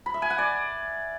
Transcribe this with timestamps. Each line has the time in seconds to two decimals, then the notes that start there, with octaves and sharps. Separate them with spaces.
0.06 B5
0.14 E5
0.22 G#5
0.30 F#5
0.38 D5